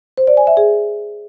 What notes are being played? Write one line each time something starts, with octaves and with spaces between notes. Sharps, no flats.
C5
D5
G#5
E5
G#4